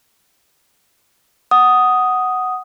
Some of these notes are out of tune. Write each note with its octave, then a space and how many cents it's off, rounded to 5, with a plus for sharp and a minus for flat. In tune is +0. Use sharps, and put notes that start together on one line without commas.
F#5 +5 D#6 +0